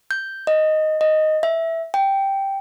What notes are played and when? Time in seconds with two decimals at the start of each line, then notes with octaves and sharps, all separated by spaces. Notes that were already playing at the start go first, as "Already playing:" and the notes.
0.11 G6
0.47 D#5
1.01 D#5
1.43 E5
1.94 G5